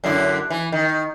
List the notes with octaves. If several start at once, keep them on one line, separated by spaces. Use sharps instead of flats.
F#2 D3 E4
E3
D#3